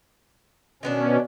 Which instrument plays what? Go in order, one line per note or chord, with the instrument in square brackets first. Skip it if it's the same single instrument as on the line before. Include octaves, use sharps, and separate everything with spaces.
[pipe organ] B2 C#4 [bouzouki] D#3 B3 D4